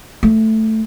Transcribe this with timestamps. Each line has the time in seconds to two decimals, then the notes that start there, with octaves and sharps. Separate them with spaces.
0.23 A3